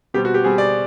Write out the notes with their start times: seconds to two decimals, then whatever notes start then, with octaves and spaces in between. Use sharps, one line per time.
0.14 B2 G3 C4 G4
0.25 F#4
0.34 G4
0.43 B2 G3 C4 G#4
0.58 D5